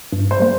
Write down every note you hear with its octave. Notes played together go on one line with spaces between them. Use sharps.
G2
C5
G3 A#3